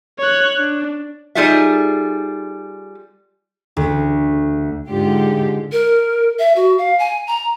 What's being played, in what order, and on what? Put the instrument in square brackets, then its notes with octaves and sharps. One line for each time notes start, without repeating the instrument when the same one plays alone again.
[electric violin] C#5 F#6
D4
[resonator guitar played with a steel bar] G3 D#4 F4 G#4 A4 E5
[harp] D2
[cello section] G#2 D3 G#3 F4 G4
[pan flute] A#4
E5
F#4
F5
G#5
A#5